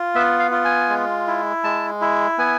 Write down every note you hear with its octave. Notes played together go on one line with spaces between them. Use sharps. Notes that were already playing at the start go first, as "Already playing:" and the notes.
Already playing: F4
B3 E5
F5
F4
G#5
G#3
E4
G#3 A5
E4
B3 G#5